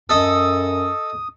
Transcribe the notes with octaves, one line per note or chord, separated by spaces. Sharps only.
F#2 A4 D#5 D#6